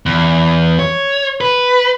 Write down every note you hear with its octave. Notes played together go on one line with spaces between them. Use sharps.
E2
C#5
B4